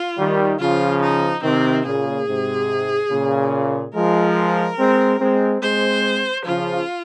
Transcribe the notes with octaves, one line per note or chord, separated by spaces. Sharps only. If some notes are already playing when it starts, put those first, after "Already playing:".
Already playing: F4
D#3 G3
C#3 F3 F4
D#4
C3 D#3 C4
A#2 C#3 G#4
G#2 C3
A#2 C#3
F3 G#3 A#4
G#3 C4
G#3 C4
G#3 C4 C5
C#3 F3 F4